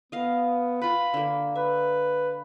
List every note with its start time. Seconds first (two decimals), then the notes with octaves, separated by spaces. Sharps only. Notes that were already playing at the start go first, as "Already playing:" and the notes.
0.12 B3 D#5 F5
0.82 F4 B4 B5
1.14 D3 A#3
1.56 B4 E5